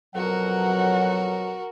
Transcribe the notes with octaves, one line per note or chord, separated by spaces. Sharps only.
F2 B2 F#3 F#4 A#4 F#5